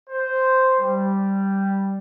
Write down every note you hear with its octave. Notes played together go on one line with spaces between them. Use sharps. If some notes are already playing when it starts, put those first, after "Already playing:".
C5
G3